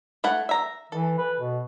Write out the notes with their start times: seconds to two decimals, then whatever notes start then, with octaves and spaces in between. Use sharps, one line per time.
0.24 A3 E4 F#5
0.49 E5 A#5
0.92 E3 A4
1.18 B4
1.39 B2